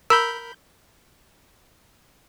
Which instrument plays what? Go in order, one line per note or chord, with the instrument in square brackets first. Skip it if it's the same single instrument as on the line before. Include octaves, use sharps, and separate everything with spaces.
[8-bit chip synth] A#4 B5 G6 [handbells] E6